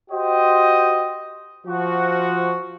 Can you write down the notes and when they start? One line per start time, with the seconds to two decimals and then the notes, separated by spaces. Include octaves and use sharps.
0.11 F#4 G4 C5 D#5
1.67 F3 F#4